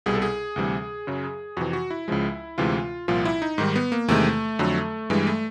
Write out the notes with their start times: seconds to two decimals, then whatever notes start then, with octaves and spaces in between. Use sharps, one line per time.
0.06 C2 B2 G3 G#4
0.15 A4
0.22 G#4
0.56 D2 C3 E3 G3
1.07 F#2 C#3 F#3
1.57 F2 C3 E3 F#4
1.73 F#4
1.90 E4
2.08 C#2 C#3 F3 G#3
2.58 D2 C3 E3 G#3 F4
3.08 C2 A#2 F3 F4
3.25 E4
3.42 D#4
3.58 G#2 D#3 G3
3.76 B3
3.92 A#3
4.08 E2 C3 D#3 G#3 A3
4.59 F2 D3 F#3
5.10 G2 E3 G3 G#3
5.27 A3